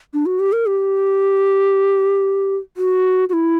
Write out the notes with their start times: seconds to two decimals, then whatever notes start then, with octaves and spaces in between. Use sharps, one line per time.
0.14 D4
0.26 F#4
0.40 G4
0.52 A#4
0.66 G4
2.77 F#4
3.29 F#4
3.33 E4